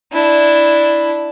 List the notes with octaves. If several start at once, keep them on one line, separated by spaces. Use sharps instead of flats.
D4 E4